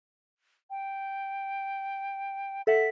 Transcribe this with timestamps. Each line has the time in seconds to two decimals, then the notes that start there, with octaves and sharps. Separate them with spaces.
0.70 G5
2.67 A4 E5 F#5 B6